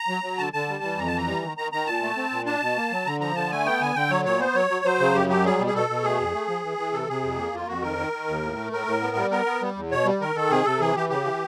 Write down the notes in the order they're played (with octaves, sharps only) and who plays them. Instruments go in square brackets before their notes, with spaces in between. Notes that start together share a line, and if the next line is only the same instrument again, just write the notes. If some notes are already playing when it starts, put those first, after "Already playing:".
Already playing: [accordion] A#5
F#3
F#3
D3 A5
D3 A5
G3
E3
F2 A#5
A5
E3
A#5
G3
D#3
D#3 A#5
D#3 A#5
A#2 A5
A3
C4
A#2
D4 A5
B2
A#3
F#3
D3 A#5
F3 A#5
D3 A5
A3 G#5
B3 G5
D3 G#5
D3 G5
F#3 C#5
A#2 C#5
B3 C5
F#3 C#5
F#3
F#3 C5
C#3
F#2 G4
F#3 G4
G3 G#4
B2
G#4
B2 A4
B2
A3 G#4
F2
A3
F3
E3
E3
C3 A4
C3 G#4
F2
A#3
F2 F4
F2 F#4
D#3 A#4
D#3
D#3
D#2
A2
A3
A2 A#4
A2
B3
G3
B3 A#4
B3
G3
E2
B2 C#5
G3
D#3 A#4
D#3 A4
C3 G#4
C3 A4
E3 G#4
E3 G4
C#3 G4
E3